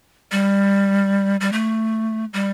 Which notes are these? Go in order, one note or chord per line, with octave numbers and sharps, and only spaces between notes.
G3
G3
A3
G3